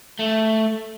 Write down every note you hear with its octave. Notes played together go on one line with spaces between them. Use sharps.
A3